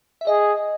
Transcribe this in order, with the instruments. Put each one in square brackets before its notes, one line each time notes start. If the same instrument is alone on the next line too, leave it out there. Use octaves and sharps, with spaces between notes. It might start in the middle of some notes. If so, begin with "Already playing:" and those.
[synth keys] E5
[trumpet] G#4 [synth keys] D#5